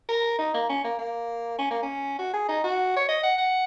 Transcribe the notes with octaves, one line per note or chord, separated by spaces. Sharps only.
A#4
D#4
A#3
C#4
A#3
A#3
C#4
A#3
C#4
F#4
G#4
D#4
F#4
C#5
D#5
F#5
F#5